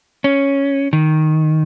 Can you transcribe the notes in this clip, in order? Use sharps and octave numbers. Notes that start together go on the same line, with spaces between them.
C#4
D#3